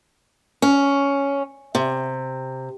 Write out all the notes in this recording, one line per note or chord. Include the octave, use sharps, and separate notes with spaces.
C#4
C3